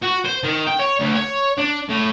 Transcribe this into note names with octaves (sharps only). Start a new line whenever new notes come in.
F#4
C5
D#3
G5
C#5
D2
C#5
D4
A2